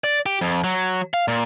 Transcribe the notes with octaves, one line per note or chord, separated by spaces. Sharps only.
D5
G4
F2
F#3
F5
A#2